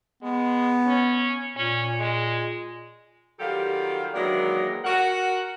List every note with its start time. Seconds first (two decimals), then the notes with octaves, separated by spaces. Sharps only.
0.23 G#3 B3
0.86 C#4
1.56 A#2 C#4
1.99 G#3
3.38 D#3 F#3 G3 F4 G4 A4
4.14 D#3 E3 F#3 G#3 A#3 D4
4.85 F#4 A#4 F#5